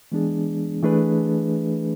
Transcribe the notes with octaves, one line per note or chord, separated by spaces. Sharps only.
E3 G#3 B3 D4 G#4
E3 A3 D4 G#4 B4